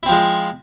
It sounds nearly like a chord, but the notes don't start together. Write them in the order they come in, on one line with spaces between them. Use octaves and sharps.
E4 C4 F3 G#3